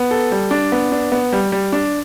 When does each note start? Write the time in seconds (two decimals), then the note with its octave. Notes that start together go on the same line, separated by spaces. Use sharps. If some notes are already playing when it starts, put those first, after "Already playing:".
Already playing: B3
0.11 A4
0.31 G3
0.51 D4
0.72 B3
0.92 D4
1.12 B3
1.32 G3
1.52 G3
1.73 D4